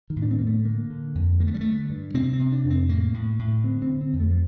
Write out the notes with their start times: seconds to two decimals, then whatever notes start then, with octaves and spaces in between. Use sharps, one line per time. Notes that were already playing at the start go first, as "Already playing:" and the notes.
0.10 D#3
0.16 A2
0.22 D4
0.31 C4
0.39 A2 A#3
0.47 A3
0.65 D3 A#3
0.90 D3
1.15 F2
1.40 D3 A#3
1.47 A3
1.54 G3
1.61 D3 A3
1.90 G2
2.14 C3 C4
2.33 C4
2.39 C3
2.52 D4
2.64 F2
2.70 C4
2.89 A2 A#3
3.14 A2
3.39 A2
3.64 D3 C4
3.82 C4
3.89 D3
4.01 C4
4.13 F2
4.20 A3
4.30 F3